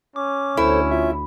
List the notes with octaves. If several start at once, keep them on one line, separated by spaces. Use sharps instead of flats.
C#4 D6
D2 E4 A4 C5 C#5
F4 E5